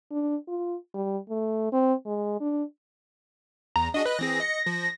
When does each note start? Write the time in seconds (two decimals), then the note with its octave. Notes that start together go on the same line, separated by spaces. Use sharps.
0.12 D4
0.48 F4
0.94 G3
1.29 A3
1.72 C4
2.06 G#3
2.40 D4
3.76 E2 A#5
3.94 D4 F#4 G#4 D#5
4.05 B4 D#5 F#6
4.19 E3 C4 G#4 A#6
4.39 D#5 C#7
4.66 F3